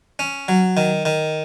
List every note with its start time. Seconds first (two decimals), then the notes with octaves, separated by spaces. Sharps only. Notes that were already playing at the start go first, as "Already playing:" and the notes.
0.19 C#4
0.48 F#3
0.77 D#3
1.05 D#3